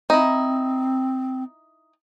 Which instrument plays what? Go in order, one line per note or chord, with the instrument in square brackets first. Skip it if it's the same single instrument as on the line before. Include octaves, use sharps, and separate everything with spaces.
[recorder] C4 [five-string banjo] D#4 E4